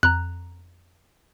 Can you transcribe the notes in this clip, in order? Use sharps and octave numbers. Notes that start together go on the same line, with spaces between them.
F2 A#5 F#6